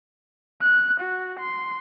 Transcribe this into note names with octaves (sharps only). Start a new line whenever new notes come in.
F#6
F#4
C6